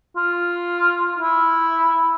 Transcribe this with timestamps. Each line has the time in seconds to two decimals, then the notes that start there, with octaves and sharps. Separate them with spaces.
0.16 F4
1.18 E4